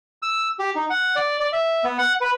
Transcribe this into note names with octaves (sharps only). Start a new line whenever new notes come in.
E6
G4
D#4
F#5
D5
D5
E5
B3
F#5
B4